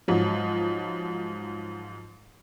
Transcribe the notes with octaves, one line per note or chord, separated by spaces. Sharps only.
G#2 F3 F#3